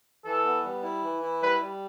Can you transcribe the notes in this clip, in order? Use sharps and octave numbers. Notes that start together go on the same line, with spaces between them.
E3 A4
B3
G3
E4
E3
E4
G3 B4
G3